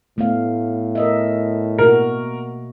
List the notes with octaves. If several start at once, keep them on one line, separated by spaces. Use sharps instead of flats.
A2 A3 B3 F5
A#4 D#5 E5
B2 A#3 F#4 A#4